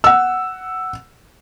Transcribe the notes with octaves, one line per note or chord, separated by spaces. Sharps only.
F#5 E6